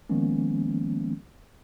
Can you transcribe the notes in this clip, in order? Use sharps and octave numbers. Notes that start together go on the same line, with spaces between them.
D#3 F3 G#3 A#3 B3 C#4